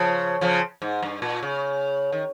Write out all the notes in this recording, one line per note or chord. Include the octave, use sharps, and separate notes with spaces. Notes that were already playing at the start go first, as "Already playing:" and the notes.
Already playing: C#3 F3
C#3 F3
G#2
G2
A#2
C#3
D#3